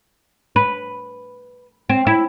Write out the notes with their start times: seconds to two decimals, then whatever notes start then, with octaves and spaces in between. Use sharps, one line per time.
0.56 B4
1.89 C4
2.07 E4